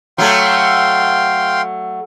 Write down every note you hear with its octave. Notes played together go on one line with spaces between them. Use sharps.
F#3 A3 F5 G5 C6